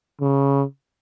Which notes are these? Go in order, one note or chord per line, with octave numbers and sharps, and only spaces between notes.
C#3